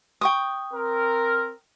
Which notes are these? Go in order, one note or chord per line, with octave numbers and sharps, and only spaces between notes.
G5 C#6 D#6
C4 A#4